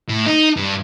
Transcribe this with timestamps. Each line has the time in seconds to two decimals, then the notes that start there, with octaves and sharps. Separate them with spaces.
0.09 A2
0.26 D#4
0.57 G2